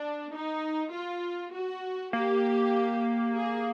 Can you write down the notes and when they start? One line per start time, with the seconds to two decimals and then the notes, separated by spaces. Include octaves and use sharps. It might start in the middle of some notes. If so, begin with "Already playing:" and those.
Already playing: D4
0.33 D#4
0.93 F4
1.53 F#4
2.13 A#3 G4
3.34 G#4